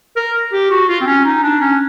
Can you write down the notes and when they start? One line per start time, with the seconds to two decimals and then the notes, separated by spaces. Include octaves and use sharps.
0.16 A#4
0.53 G4
0.71 F#4
0.88 F4
1.01 C4
1.07 C#4
1.25 D#4
1.43 D4
1.60 C#4